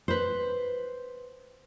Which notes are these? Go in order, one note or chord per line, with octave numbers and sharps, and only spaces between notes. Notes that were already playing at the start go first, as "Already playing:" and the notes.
B4 C5